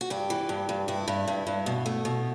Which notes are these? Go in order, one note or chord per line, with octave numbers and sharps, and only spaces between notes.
F#4
G2 G4
E3
G2
G2
G2 E4
G2
G2
G2
B2
A3
B2